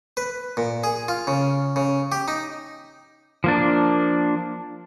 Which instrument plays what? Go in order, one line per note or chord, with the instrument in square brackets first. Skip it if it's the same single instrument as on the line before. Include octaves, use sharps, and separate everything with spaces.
[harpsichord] B4
A#2
G#4
F4
C#3
C#3
G4
D#4
[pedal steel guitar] F3 A#3 D4